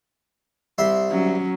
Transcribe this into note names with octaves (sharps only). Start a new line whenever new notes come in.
C2 E5 C6
F#3 C#4